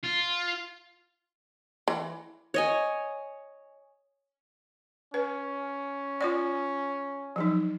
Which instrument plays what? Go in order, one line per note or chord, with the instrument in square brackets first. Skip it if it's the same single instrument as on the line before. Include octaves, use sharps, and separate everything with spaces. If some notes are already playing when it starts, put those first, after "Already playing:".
[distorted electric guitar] F4
[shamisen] E3
[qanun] C#5 D#5 G#5
[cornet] C#4 [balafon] B4
[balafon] F4 C#5 D5
F3 F#3 D#4